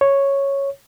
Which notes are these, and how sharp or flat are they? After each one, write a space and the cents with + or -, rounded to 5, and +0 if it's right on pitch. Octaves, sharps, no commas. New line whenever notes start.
C#5 -5